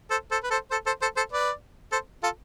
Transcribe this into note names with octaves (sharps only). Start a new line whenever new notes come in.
A4 C5
A4 C5
B4
A4 C5
A4 C5
A4 C5
A4 C5
A4 C5
B4 D5
A4 C5
F4 A4